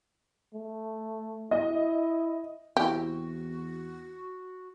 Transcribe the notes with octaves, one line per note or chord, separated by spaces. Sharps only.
A3
E4 D#5
E2 C4 E4 F#4 G4